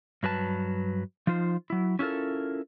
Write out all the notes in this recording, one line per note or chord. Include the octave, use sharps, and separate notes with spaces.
G2 F#3 B4 A5
F3 D#4 F4 C5
F#3 E4
C#4 E4 F4 A4 A#4